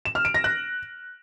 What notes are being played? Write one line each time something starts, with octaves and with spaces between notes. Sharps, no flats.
E7
F6
D7
A#6
F#6